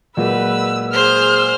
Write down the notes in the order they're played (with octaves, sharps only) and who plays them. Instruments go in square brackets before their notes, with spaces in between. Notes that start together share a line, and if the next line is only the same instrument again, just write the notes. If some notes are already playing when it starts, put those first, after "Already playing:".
[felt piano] A#2 F#3 G#3 [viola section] B4 [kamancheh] E6
[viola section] G#4 [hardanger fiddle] C5 [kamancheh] F6